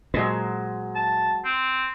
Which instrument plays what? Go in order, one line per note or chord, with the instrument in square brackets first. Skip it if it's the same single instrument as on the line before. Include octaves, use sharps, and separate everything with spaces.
[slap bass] A#2 [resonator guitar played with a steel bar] F#3 G#3 C5
[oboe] A5
C4